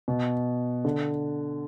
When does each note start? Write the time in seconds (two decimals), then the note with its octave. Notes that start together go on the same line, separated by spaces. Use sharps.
0.08 B2
0.85 D3